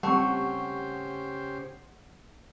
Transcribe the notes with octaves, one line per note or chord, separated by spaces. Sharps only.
C#3 G3 A3 C4 G4 C5 F#5 C#6